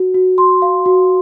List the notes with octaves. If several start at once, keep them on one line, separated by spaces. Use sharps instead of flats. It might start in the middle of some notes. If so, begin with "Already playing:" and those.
Already playing: F#4
F#4
C6
F5
F#4